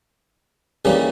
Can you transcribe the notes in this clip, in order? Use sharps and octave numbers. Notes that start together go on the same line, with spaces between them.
D#2 C#3 E3 G3 A#3